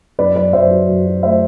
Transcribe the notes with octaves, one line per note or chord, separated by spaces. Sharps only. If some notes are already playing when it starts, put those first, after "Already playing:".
F#2 B4 D5
F#2 B4 D5
F#2 C5 E5
F#3
F#2
F#3
A3 C5 E5